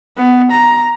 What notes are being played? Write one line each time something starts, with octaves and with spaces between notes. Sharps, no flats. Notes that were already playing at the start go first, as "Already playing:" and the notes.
B3
A#5